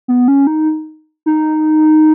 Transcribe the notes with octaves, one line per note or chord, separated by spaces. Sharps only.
B3
C#4
D#4
D#4